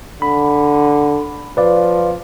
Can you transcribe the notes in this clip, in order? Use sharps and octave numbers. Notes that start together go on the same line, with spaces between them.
D3 B5
F3 B4 D5 F5